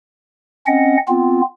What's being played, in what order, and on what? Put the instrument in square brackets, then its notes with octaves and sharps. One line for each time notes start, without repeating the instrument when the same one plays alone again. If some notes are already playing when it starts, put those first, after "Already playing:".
[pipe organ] C4 C#4 D#5 F#5
B3 C4 F4